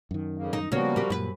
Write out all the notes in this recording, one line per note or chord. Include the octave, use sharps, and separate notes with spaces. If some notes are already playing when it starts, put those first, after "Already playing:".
F#2 D#3
F2 C#3 A#3
D#4
C#3 F3 G3 A#3 B3 F#4 C#5
A#3 G4
F#2 A#2 B4